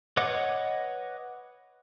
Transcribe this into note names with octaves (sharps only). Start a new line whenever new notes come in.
B4 C#5 D#5 F#5 D6